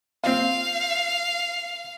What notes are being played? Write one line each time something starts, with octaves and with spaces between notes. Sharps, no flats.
C4 F4 F5